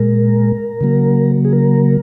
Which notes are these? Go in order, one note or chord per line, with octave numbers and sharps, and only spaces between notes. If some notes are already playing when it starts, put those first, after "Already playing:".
Already playing: A#2 G#3 A#4
C#3 F#3 A#3
G#4
A#4